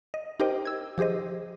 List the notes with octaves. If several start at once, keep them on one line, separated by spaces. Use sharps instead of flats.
D#5
D#4 G4 A#4 C5 D#5 G5
E6 G#6
F3 G4 G#4 C5 D#5